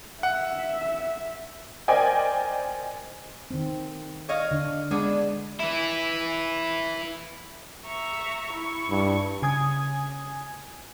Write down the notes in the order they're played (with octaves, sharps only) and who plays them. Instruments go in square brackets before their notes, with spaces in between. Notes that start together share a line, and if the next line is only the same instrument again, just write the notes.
[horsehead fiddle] E5 [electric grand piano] F#5
[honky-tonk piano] A#4 C5 D5 D#5 G5 G#5
[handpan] D#3 C4
[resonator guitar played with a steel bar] C#5 D#5 F5
[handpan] D3 D4
[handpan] G#3 [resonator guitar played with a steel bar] B3 D4 G#4
[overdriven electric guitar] E3 E4
[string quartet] E5 A#5 C#6
E4 C#6
[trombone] G2
[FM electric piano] C#3 G#5 D#6 G#6